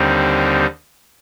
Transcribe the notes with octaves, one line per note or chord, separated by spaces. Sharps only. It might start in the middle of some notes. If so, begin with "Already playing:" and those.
Already playing: D#2 D3 G3 C4 D#4